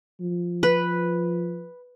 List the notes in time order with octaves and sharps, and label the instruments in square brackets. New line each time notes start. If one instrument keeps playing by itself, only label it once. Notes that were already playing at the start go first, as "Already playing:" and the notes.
[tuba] F3
[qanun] B4